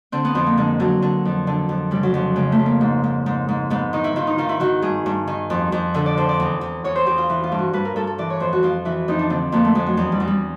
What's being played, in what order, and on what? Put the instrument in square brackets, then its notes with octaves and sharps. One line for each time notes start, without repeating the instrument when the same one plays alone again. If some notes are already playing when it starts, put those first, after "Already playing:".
[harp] D3 C4
B3
F2 C4
A#3
D3 G#3
D3 F#3
D3
F2
D3
F2
C#3 G3
F#3
F2 F#3
C#3 G#3
A3
F2
A#3
G#2
G#2
G#2
G#2
G#2 B3
D#3 D#4
E4
D#3 F4
D#4
D#3 F4
E4
D#3 F#4
G2 G#4
G2
D#3
F2
F2
D3 A4
D5
D3 C5
D5
E2
E2
E2 C#5
C5
E2 G4
F4
E3
F4
G2
F#4
G2 B4
A#4
G2 A4
A4
E3 D5
C#5
F2 C5
F#4
F2 F4
E3 E4
F2 D#4
D4
D3 C4
F2 A#3
A3
F2 G#3
F#3
E2
G3
E2
G3